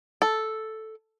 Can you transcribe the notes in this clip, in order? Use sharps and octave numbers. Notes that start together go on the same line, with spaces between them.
A4